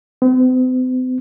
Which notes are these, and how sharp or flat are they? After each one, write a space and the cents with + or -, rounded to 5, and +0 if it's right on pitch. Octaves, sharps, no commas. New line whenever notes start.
C4 -45